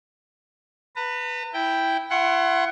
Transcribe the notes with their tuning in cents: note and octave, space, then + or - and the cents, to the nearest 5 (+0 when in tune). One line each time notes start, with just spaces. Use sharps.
B4 +0 A#5 -45
E4 +0 G5 +0
E4 +45 F#5 +15 C6 +45